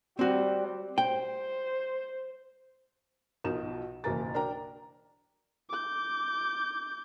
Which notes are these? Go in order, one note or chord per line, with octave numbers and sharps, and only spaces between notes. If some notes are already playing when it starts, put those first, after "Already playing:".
G3 C4 F#4
C5 G5
B1 B2 F3 D#4 A#4 E7
F#1 B1 E3 A#4 A#5 A6
D4 A#4 G5 A#5
D6 G6